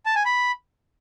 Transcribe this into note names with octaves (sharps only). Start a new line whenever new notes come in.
A5
G#5
B5